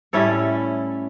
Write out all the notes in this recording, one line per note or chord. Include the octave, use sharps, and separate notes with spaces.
A2 G3 C#4 E4 A4 C#5